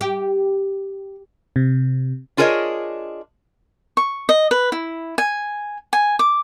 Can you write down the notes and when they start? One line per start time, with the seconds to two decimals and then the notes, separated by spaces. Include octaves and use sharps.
0.01 G4
1.56 C3
2.37 D4 F4 G#4 A#4 C#5 D#5
3.97 C#6
4.29 D#5
4.51 B4
4.72 E4
5.18 G#5
5.93 G#5
6.19 D6